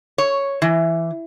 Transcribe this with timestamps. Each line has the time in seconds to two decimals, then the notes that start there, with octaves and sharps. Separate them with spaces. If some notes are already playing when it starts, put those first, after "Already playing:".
0.18 C#5
0.62 E3